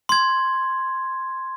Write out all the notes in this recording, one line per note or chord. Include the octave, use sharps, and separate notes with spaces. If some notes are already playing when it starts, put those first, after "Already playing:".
C6 G#6